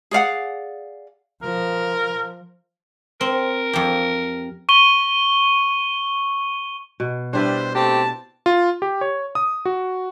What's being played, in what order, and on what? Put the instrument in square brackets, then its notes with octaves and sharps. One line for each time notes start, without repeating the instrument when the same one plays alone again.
[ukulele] G#4 D5 F5 F#5
[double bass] F3 [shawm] A#4
[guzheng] C4 [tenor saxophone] A#4
[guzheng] F2 G4
[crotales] C#6 D#7 G7
[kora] B2
[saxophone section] G3 [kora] D4 E4 B4 [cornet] C5
[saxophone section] A3 C4 G4 [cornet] A5
[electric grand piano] F4
G4
C#5
D#6
F#4